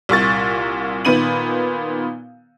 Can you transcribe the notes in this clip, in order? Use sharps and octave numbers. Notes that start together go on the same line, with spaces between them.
C2 A#2 C#6 A6
A#2 D#3 B3 D#7 F#7